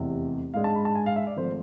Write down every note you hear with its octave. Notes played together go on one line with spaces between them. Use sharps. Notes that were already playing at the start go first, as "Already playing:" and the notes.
Already playing: F1 E2 C3 E3
G#2 G#3 D4 F5
A5
B5
A5
G#5
F5
E5
D5
G#1 F3 A3 C5